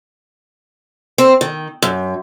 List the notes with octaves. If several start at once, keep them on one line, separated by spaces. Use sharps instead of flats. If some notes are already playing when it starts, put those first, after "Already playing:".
C4
D#3
F#2